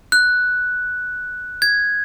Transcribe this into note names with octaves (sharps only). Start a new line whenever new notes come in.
F#6
G#6